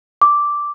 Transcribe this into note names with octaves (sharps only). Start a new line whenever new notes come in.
D6